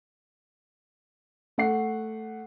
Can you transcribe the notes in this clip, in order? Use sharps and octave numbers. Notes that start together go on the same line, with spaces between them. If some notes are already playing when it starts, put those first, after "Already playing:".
A3 F#5 C7